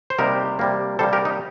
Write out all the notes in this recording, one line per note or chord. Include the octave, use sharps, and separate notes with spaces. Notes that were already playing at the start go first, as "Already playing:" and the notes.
C5
C3 G3 A#3 D#4 G4 A#4
C3 G3 A#3
C3 G3 A#3 A4 C5
G4 A#4
D#4